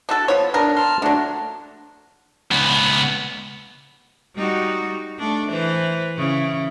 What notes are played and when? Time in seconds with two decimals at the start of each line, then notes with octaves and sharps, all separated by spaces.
0.09 D4 F#4 A4
0.28 F3 B3 C#5
0.54 B3 D4 A#4
0.77 A5 C6 F6
1.02 D3 F#3 A3 D4
2.51 C#2 B3
4.35 G3 D#4 F#4
5.18 A3 D4 A4
5.49 E3 B4 C5
6.17 C#3 E4